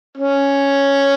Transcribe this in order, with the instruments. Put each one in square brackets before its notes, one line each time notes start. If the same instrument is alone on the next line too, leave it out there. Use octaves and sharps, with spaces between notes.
[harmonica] C#4